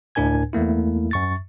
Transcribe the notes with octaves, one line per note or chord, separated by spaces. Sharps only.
D2 A2 D4 A#4 G#5 G#6
E2 A3 A#3 E4
F#2 C#6 A6